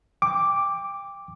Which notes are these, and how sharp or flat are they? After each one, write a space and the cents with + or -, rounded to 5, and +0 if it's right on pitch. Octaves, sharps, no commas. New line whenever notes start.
G5 +25 D6 +0